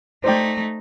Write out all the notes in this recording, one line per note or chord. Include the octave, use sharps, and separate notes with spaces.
A3 D#4 C5 D5 G5